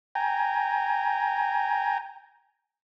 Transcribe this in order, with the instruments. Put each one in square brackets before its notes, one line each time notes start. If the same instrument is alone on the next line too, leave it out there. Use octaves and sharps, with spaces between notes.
[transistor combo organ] G5 G#5 A#5